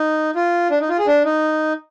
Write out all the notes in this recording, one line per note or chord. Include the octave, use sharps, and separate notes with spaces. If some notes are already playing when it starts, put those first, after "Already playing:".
Already playing: D#4
F4
D4
D#4
F4
G#4
D4
D#4